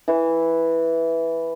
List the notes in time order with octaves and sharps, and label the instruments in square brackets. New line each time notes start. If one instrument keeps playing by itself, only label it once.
[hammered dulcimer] E3